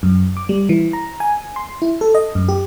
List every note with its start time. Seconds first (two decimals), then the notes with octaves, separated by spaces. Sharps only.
0.03 F#2
0.37 D6
0.49 G3
0.69 E3
0.93 A#5
1.20 G#5
1.56 C6
1.82 E4
2.01 A4
2.15 D#5
2.35 F#2
2.49 G4